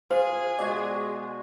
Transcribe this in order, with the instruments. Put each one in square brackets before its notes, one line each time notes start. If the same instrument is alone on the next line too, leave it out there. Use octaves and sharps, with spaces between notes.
[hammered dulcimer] F4 [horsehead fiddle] G#4 [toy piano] C5 [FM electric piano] F5
[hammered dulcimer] B2 G#3 F#4 [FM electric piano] D5